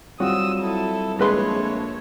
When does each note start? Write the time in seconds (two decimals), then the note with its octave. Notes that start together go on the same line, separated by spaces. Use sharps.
0.20 F#3 G3 C4 F4 F#4 D#6 E6
0.60 E4 A4
1.19 A#1 G#3 A3 B4 C#5 C6